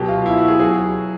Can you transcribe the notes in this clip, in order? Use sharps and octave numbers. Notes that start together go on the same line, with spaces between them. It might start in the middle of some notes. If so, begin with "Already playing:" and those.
Already playing: B2 F#3 G4
F4
E4
F#4
G#4
F#3 G#4